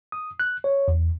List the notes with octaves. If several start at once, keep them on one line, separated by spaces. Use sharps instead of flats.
D#6
F#6
C#5
E2